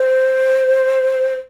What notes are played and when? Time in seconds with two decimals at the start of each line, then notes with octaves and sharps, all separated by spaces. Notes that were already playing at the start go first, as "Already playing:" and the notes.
Already playing: C5